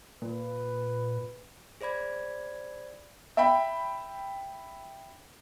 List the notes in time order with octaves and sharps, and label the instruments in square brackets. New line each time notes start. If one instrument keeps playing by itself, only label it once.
[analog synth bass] A#2 [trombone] B4
[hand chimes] G#4 C5 D5 B5 G#6
[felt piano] E5 G5 B5